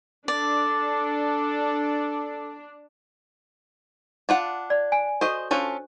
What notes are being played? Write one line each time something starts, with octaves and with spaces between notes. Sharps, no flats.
D4 A4 D5
D4 F4 F#5
D5
G#5
F#4 A4 C5 D#5 C#6
C#4 D4 F4 A4 C5